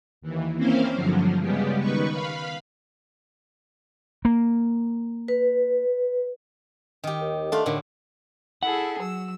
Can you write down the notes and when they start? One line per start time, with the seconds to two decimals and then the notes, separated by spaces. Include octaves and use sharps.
0.21 D#2 E3
0.56 A#3 C4 C#4 E4 C5 F5
0.94 G2 D3 F3 F#3
1.39 C#3 G3 G#3 B3 G4
1.79 D#3 B4 C#6
2.09 F5 B5
4.25 A#3
5.28 B4
7.04 D#3 G4
7.21 D#2
7.52 A3 D4 F4
7.66 A2 D3 D#3
8.63 E4 G#4 A4 F#5
8.99 F#3 E6